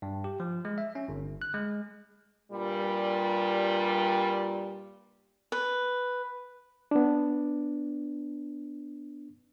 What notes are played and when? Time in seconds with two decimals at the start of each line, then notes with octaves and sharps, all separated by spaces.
0.02 G2
0.24 G4
0.40 F3
0.65 G#3
0.78 E5
0.95 C#4
1.08 G1
1.42 F#6
1.54 G#3
2.52 G2 A#2 G3
5.52 B4
6.91 B3 D4